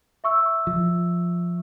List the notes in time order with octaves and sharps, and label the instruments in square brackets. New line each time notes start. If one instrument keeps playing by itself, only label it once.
[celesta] E5 C#6 E6
[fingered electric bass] F3